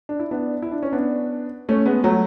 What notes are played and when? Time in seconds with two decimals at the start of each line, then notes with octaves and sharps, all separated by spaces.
0.09 D4
0.19 E4
0.31 B3 D4
0.62 E4
0.72 D4
0.83 C#4
0.92 B3 D4
1.69 A3 C#4
1.86 G#3 B3
2.04 F#3 A3